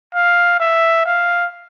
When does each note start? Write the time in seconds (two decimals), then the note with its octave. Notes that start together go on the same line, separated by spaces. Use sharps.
0.14 F5
0.60 E5
1.05 F5